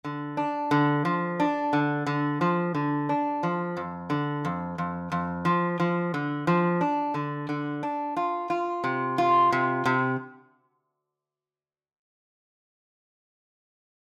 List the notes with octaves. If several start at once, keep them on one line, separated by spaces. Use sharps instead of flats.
D3
D4
D3
F3
D4
D3
D3
F3
D3
D4
F3
F2
D3
F2
F2
F2
F3
F3
D3
F3
D4
D3
D3
D4
F4
F4
C3
F4
C3
C3